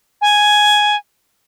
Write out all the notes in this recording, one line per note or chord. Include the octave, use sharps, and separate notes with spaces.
G#5